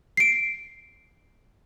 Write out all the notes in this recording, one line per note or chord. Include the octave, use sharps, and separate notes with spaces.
C7 D7